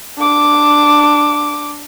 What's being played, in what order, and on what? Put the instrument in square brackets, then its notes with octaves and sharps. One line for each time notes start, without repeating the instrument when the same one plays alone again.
[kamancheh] D4 D6